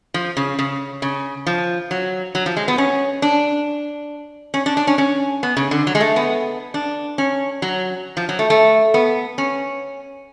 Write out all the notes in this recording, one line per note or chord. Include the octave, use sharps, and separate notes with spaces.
F3
C#3
C#3
C#3
F3
F#3
F#3
F3
G#3
B3
C#4
D4
C#4
D4
D4
C#4
C#4
B3
C#3
D3
F#3
G#3
A3
B3
D4
C#4
F#3
F3
F#3
A3
A3
B3
C#4